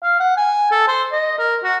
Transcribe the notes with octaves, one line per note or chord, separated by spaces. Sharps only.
F5
F#5
G#5
A4
C5
D#5
A#4
F#4